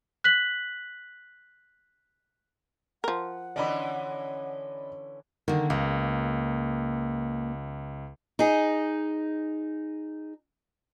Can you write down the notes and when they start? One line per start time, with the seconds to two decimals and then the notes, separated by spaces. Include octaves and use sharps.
0.24 F#6 B6 F#7
3.04 F3 A#4 F#5
3.56 D3 E3 C#4 D5 D#5 B5
5.48 D3 D#3 A#3
5.70 C#2 A#3
8.39 D#4 G#4